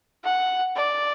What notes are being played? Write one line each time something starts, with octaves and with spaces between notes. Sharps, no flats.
F#5
D5